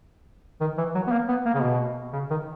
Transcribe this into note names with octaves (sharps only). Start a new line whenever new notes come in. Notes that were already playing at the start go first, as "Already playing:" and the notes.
D#3
E3
F#3
B3
A#3
B3
A#3
C#3
B2
C#3
D#3